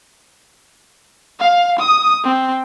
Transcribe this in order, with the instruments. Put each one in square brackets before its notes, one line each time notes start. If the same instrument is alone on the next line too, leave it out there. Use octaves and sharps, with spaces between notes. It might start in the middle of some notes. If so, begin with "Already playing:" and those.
[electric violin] F5
D#6
C4